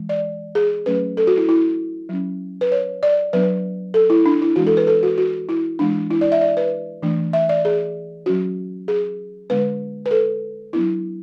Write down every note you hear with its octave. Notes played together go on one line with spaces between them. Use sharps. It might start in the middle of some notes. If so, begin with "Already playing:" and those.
Already playing: E3 G#3
D5
G#4
F#3 A3 C#4 B4
A4
F#4
E4
E4
F#3 C#4
B4
C#5
D5
F#3 B3 D4 B4
A4
E4
D4
E4
E3 G#3 D4 F#4
A4
B4
A4
F#4
F#4
E4
E3 G#3 B3 D4
E4
D5
E5
D5
B4
E3 A3 D4
E5
D5
G#4
F#3 C#4 F#4
G#4
D3 G#3 B3 D4 B4
B4
A4
F#3 B3 D4 E4